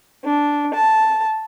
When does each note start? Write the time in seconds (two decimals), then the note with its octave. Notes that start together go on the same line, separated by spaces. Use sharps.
0.23 D4
0.74 A5